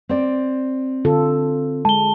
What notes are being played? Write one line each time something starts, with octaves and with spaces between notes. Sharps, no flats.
C4 D5
D3 F4 A4
G#3 A5 G7